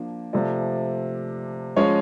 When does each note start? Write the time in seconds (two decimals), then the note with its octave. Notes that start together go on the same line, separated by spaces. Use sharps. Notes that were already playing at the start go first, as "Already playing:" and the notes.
Already playing: F3 A#3 D4
0.33 C3 F3 A3 D5
1.76 F3 G#3 C#4 C#5